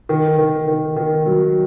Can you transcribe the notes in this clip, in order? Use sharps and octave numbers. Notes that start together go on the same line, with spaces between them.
D#3
D#3
D#3
D#3
F#3